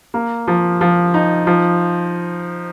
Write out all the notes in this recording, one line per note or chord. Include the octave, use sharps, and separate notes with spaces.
A#3
F3
F3
D#4
F3